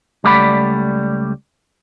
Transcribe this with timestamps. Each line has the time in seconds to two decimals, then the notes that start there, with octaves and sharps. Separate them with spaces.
0.24 C#2 G3 A3 D5 F#5 B5